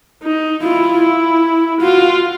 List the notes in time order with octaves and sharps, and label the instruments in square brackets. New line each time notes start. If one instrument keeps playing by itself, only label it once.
[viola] D#4
[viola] E4 [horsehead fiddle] F4
[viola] E4
[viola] F4 [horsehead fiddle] F#4